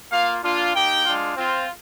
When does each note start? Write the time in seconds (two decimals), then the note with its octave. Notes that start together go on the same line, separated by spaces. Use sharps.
0.12 A#3 F4 F5
0.43 A#3 D4 F4
0.74 A#3 D#4 G4 G5
1.06 G#3 D4 F4
1.37 C4 F4